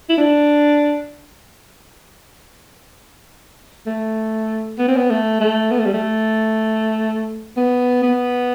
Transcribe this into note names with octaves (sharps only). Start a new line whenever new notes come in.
E4
D4
A3
B3
C4
B3
A3
A3
B3
A3
G3
A3
B3
B3